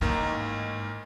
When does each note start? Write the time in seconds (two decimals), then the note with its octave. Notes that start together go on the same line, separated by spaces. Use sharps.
0.01 A1 G#2 D#3 A#3